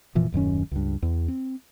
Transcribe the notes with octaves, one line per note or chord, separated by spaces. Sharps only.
F1 A#2 E3 F3
D#1 F#2 D#3 C#4
C#2 G2
E2
C4